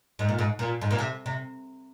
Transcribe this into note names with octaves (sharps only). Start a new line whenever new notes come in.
G#2
A#2
G#2
A#2
G#2
A#2
C3
C3